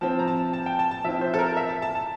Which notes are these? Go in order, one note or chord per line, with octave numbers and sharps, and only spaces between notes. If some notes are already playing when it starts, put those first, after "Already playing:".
F3 C4 E4 A5
A#5
A5
A5
G5
A5
A5
F3 C4 E4 E5
C5
A4
A#4
E5
A5
A5
A5